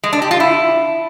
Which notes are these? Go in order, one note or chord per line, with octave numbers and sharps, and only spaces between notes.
G#3
D4
G4
F4
E4